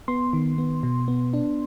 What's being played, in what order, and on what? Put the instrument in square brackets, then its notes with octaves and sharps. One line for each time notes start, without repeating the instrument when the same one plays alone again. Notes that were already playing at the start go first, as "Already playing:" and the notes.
[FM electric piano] B3 C6
D#3
B3
B2
B3
D4